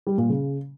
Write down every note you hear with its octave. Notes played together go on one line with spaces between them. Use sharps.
G3
A#2
C#3